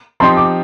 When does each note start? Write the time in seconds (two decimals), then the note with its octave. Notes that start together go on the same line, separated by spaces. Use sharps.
0.20 F3 C4 D#4 G4 C6
0.37 D6